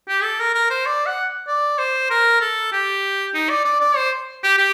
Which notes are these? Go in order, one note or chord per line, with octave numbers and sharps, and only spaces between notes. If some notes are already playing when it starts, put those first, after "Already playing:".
G4
A4
A#4
A#4
C5
D5
F#5
D5
C5
A#4
A4
G4
D#4
D5
D5
D5
C5
G4
G4